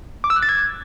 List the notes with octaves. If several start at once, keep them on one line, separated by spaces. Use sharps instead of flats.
D6
E6
F#6
A6
G#6